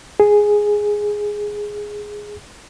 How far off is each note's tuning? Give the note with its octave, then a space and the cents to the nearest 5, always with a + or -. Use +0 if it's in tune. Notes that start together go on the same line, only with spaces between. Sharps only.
G#4 +0